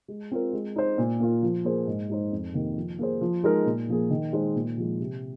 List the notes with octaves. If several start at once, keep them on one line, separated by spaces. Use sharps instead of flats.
G#3
C4 F4 A#4
G#3
D#4 C5
A#2
A#3 F4
F3
A#3 G#4 C5
G#2
G#3 D#4 C5
F2
C3 D#3 A#3
F3
A#3 G#4 C5
F3
G#3 D#4 A#4
A#2
F3 A#3 G#4
D#3
G#3 D#4 C5
A#2
F3 G#3
C3